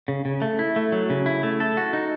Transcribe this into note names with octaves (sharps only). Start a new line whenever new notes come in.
C#3
C#3
A3
E4
A3
F#3
C#3
E4
A3
A4
F#4
D#4